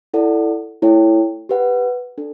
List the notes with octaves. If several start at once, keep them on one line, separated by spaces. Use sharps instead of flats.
E4 A4 D5 F#5
A3 E4 A4 C#5 G5
G4 B4 F#5
D4 A4